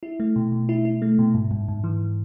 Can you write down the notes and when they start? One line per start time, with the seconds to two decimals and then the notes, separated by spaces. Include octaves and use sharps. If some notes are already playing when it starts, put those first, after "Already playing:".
0.03 E4
0.20 A3
0.36 B2
0.52 B2
0.69 E4
0.85 E4
1.02 A3
1.19 B2
1.34 G#2
1.51 G#2
1.68 G#2
1.84 E3